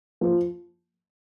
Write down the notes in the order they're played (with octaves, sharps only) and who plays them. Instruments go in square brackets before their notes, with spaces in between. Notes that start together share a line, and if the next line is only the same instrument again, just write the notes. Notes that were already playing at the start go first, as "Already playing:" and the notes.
[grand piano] F3